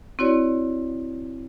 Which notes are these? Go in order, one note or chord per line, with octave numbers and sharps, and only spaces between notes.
C4 E4 F#4 C#5 D5